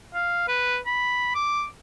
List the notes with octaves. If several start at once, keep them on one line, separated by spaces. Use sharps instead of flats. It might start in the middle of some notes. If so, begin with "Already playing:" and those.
F5
B4
B5
D6